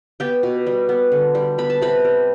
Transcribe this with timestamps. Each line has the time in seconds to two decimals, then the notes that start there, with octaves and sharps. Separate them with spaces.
0.20 B3 G4 G5
0.43 B2
0.67 G3
0.89 B3
1.12 D3
1.35 G3
1.58 B3 B5
1.70 A5
1.82 C3 B4 B5
2.05 G3